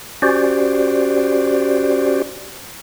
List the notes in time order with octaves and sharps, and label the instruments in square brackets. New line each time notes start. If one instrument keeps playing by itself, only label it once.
[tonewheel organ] C#4 F#4 G4 C5 D5